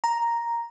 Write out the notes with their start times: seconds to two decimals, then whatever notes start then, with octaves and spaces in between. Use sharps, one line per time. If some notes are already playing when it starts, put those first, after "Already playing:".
0.04 A#5